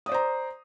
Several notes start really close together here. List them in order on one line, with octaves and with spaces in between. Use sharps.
D#6 D5 C5 A#5